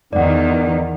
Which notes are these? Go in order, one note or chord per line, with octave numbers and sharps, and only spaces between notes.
E2 D#3 D5 F#5